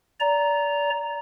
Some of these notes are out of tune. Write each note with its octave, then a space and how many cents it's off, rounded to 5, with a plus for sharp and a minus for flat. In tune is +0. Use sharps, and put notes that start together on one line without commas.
D5 -25 A#5 +0